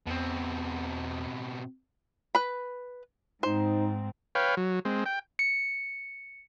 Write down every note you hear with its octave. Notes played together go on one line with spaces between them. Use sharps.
E2 B2 C4
B4 B5
G#2 C4 D#4 C5
B4 C#5 F5 G5
F#3
G#3 C4
G5
C#7